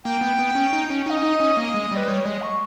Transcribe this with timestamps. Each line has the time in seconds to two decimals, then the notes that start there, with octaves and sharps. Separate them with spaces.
0.04 A#3 G5
0.21 B3
0.39 B3
0.55 C#4
0.73 D#4
0.90 C#4
1.06 D#4 G5
1.10 D#5
1.17 C#4
1.23 D#4
1.40 C#4
1.57 A#3
1.74 G#3
1.91 G3
1.96 B4
2.08 G3 C#5
2.25 G#3 D#5
2.42 C#6